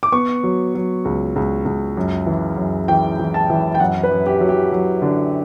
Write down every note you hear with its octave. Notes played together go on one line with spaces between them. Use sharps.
D6
B3 C#6
F#3
F#3
C#2
C#2
C#2
F#2
E3
F#2
E3 G5
E3
A5
E3
G5
F#2 F#5
B4
F#2
G4
F#3
G4
F#3
D3